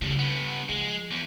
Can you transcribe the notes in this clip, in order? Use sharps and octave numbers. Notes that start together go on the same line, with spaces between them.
A2 C#3 G3
G2 B3
F3 G#3
E2